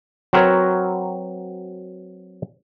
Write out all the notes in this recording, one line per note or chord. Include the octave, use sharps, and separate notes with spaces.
F#3 C4 F#4 A#4 B4 C#5